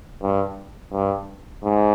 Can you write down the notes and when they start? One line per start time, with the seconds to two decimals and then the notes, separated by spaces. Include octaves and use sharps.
0.22 G2
0.92 G2
1.63 G#2